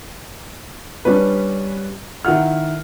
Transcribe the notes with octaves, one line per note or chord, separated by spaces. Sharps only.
G3 C#4 D4 B4
D#3 E4 F#5 F6